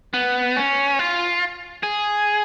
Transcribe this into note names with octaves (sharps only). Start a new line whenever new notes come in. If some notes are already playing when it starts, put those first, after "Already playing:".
B3
C#4
F4
G#4